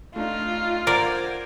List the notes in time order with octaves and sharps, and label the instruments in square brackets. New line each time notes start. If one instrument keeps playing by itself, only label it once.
[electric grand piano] A3 D4 D#4 [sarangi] F4
[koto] A#4 D5 [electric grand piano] C5 F#5 G#6